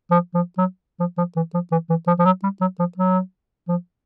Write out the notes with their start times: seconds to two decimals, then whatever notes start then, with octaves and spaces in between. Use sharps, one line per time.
0.11 F3
0.34 F3
0.58 F#3
1.00 F3
1.18 F3
1.36 E3
1.54 F3
1.71 E3
1.89 E3
2.07 F3
2.19 F3
2.25 F#3
2.43 G3
2.61 F#3
2.79 F3
2.97 F#3
3.68 F3